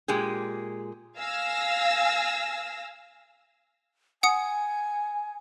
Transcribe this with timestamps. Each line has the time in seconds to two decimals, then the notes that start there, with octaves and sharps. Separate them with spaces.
0.08 A#2 G#3 G4 G#4
1.18 F5 G#5 E6 A#6
4.23 F#5 G#5 D#6 C#7